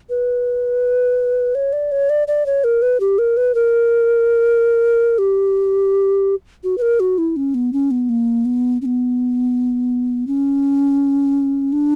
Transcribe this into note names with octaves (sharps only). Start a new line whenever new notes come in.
B4
C#5
D5
C#5
D5
D5
C#5
A#4
B4
G4
A#4
B4
A#4
G4
F#4
B4
A#4
F#4
E4
C#4
B3
C#4
B3
A#3
B3
C#4
B3
C#4
D4